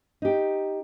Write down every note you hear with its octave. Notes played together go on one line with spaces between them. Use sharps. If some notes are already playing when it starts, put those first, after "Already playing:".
D#4 G4